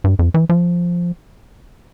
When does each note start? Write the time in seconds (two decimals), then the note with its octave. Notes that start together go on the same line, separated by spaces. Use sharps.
0.04 G2
0.19 F2
0.34 E3
0.49 F3